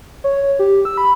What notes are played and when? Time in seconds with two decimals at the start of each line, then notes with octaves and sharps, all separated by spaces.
0.24 C#5
0.59 G4
0.85 E6
0.97 B5